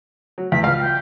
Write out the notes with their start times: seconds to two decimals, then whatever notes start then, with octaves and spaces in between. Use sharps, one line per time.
0.38 F#3
0.52 E2 B6
0.63 C#2 F5 F6
0.80 G5